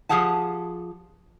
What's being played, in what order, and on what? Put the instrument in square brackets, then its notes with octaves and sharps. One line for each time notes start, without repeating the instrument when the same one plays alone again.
[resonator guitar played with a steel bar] F3 D4 G4 G#4 F#5 A5